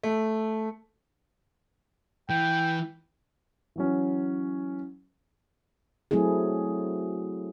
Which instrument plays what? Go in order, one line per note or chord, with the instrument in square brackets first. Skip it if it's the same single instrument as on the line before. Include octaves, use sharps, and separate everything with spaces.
[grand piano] A3
[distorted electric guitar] E3 [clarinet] G5
[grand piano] E3 F#3 C#4
[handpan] F#3 A3 C4 E4 G#4